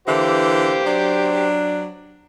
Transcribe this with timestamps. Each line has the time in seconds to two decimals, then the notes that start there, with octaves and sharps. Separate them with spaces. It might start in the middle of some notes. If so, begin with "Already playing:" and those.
0.08 D3 E3 A#3 G4 C5
0.86 F#3 D4